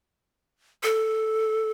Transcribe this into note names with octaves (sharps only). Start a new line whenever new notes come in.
A4